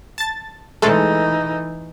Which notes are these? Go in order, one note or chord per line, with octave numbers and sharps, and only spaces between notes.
A5 A6
E3 G#3 A3 D#4 A4